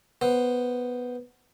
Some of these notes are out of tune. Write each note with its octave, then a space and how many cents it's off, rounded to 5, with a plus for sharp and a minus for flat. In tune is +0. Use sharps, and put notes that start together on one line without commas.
B3 +0 C5 +0